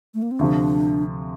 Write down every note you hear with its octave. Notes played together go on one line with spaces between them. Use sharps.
A3
A#3
C4
D2 C3 F3 D4